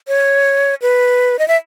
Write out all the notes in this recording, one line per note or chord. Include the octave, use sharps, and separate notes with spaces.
C#5
B4
D#5
E5